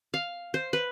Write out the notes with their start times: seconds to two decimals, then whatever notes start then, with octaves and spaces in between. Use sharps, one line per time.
0.14 F5
0.54 C5
0.73 B4